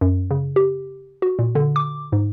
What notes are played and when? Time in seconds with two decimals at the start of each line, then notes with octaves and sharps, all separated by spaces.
0.01 F#2
0.31 C#3
0.56 G4
1.22 F#4
1.39 A#2
1.55 D3
1.76 D6
2.12 G#2